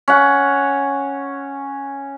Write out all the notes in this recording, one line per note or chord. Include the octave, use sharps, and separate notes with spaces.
C#4 F#5